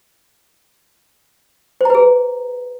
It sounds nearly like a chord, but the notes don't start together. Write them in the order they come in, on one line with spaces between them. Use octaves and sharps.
C5 A#5 B4 G#4